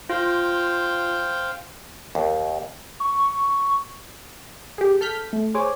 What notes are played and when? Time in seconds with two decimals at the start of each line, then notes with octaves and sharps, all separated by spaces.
0.10 F4 C5 F5 G5
2.15 D#2
3.00 C#6
4.78 G4 G#4
5.01 A4 F6 G6 B6
5.33 A3
5.55 G#4 C5 C#5 G#5 D6